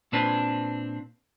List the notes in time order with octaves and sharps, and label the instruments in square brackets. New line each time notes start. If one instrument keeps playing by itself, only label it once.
[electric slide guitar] A#2 C4 D4 B4 C5 A5